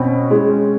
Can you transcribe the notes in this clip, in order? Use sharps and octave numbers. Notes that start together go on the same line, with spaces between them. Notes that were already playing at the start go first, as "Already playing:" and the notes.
Already playing: B2 C4 C#4
G#3